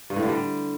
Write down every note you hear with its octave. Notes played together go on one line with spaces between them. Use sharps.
G2
A2
D3
G3